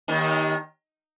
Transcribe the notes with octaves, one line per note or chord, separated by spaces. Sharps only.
D#2 D#3